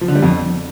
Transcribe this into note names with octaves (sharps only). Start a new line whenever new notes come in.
F3
D3
G3
F2